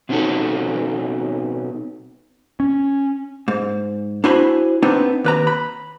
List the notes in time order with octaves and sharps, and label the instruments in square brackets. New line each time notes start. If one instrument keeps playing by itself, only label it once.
[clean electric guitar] B2 C4 C#4 D#4 F#4 A4
[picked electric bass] C#4
[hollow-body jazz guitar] G#2
D4 E4 F#4 C5 G#5 B5
B3 C4 D4 D#4
D#2 B4 A#5
B5